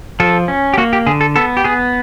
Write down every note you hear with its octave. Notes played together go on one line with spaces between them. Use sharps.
F3 A4
C#4
G4
A#3 F#4
G4
D3 G#4
A4
B3 A4
G4
B3 G#4